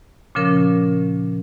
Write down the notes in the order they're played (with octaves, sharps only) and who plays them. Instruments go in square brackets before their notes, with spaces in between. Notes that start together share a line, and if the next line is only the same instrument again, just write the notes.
[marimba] A#2 C#3 F3 C#4 A#4